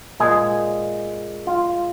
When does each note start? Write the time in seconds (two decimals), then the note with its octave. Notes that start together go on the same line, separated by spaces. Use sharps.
0.20 A#2 G#3 G#4
1.47 F4